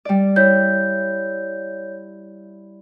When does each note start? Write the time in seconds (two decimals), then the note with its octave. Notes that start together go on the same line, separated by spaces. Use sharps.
0.05 G3 D5
0.36 E4 C#5 G6